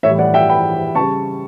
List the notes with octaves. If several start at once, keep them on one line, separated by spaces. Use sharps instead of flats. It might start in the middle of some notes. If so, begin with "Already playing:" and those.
A2 E3 G3 C#5 E5
D5 F#5
E5 G5
G5 B5
C#3 G3 A5 C#6